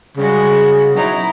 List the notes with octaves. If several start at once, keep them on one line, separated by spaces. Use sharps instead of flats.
C#3 G3 G#3 F#4
B2 F#3 D#4 E4